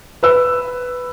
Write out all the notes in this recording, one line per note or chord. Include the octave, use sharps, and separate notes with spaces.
B4 E6